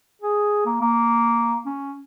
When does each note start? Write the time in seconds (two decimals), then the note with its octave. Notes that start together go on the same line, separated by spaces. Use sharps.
0.22 G#4
0.66 A#3
0.82 A#3
1.66 C#4